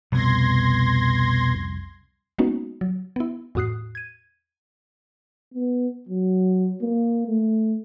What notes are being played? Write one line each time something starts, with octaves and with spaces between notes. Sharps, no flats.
C2 F2 B2 C6 G#6 A#6
G#3 A#3 B3 C#4 D#4 F#4
F#3
B3 E4
E2 A2 F#4 D#6 F#6 C7
G#6 D#7
B3
F#3
A#3
A3